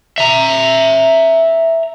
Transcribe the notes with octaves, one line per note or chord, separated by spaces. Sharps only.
E5 A#5